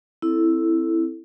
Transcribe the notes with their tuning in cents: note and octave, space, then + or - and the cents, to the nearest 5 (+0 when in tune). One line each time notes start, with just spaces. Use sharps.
C4 +0 E4 +0 A4 +0